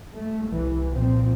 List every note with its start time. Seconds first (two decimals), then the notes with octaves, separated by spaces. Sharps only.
0.15 A3
0.48 C2 E3
0.91 A#2 F3 C4